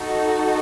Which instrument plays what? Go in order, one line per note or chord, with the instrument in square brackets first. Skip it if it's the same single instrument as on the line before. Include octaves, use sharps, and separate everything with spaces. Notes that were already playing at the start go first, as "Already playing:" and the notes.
Already playing: [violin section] D#4 F#4 A4